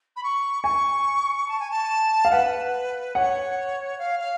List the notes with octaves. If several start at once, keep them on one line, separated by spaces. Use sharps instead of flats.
B5
C#6
G#5 C#6
A5
G#5
A5
F5
B4 F#5
C#5 F#5
F5
F5